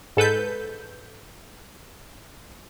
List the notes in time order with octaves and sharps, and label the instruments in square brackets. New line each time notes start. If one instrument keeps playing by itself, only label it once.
[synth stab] G#2 A4 B4 G6